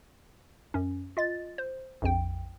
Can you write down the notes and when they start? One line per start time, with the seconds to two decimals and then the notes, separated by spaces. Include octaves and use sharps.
0.74 F#2 C#4
1.17 F4 D#5 A6
1.58 C5
2.02 A#1 F2 G5